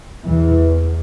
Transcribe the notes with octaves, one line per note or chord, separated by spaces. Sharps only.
E2 E3